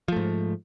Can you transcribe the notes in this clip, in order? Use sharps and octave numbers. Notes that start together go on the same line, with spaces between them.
G#2 F3 A3